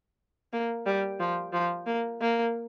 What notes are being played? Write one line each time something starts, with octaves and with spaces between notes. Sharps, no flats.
A#3
G3
F3
F3
A#3
A#3